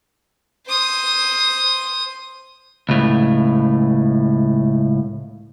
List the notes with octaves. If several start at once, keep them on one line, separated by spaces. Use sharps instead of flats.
C5 D#6
C#2 A2